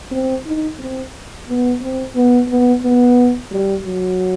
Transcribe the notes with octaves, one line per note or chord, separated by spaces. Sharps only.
C4
D#4
C4
B3
C4
B3
B3
B3
G3
F#3